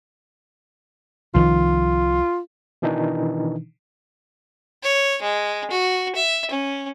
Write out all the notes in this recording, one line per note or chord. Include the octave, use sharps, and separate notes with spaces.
C2 D#3 F3 F4
B2 D#3 E3 D4 D#4
C#5
G#3
F#4
E5
C#4